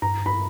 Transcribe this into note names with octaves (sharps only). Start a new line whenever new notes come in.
G2 A#5
B5